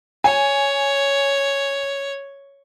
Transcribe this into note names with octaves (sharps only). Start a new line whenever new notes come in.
C#5 G#5